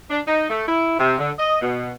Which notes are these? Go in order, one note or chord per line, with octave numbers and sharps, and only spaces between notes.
D4
D#4
A3
E4
C3
D3
D#5
B2